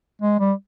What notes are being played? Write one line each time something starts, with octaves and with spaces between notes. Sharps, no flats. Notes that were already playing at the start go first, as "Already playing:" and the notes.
G#3
G3